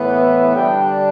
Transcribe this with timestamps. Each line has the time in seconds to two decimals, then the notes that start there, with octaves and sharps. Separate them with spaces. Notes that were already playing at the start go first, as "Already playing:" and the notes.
Already playing: A2 E3 B3
0.14 E5
0.55 D3 G3 D4 G5